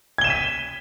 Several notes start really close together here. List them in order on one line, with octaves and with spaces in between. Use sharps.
G#6 G7 E7 D#7 B6